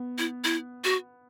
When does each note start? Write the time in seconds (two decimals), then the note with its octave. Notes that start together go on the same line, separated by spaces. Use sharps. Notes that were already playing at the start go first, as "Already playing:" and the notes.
Already playing: B3
0.18 E4
0.44 E4
0.84 F#4